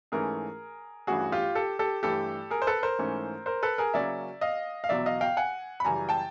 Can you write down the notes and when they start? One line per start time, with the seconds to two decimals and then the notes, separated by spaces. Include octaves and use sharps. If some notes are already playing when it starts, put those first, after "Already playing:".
0.12 G#2 E3 A3 C#4 G#4 A#4
1.07 G2 E3 A3 C#4 F#4 G#4
1.32 F4 G4
1.55 G4 A4
1.79 G4 A4
2.03 G2 E3 A3 G4 A4
2.51 G#4 A#4
2.62 C5
2.67 A4 B4
2.83 A#4 C5
2.99 G#2 E3 A3 C#4
3.46 A#4 C5
3.63 A4 B4
3.78 G#4 A#4
3.94 C#3 F#3 A#3 C#4 D5 E5
4.41 D#5 F5
4.84 F5
4.89 E2 B2 F#3 D5 E5
5.06 D#5 F5
5.21 F5 G5
5.37 F#5 G#5
5.80 B5
5.85 F#2 C#3 E3 G3 G#5 A#5
6.09 G5 A5